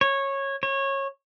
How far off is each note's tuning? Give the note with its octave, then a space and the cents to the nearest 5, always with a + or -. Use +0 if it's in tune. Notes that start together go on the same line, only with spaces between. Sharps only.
C#5 -15
C#5 -20